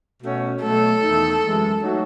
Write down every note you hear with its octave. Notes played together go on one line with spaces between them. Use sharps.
B2 A3 C#4 F#4
B2 F#3 A3 A4
E2 D#3 A3 D#4
F#2 E3 G#3
F#3 A3 D#4 F#4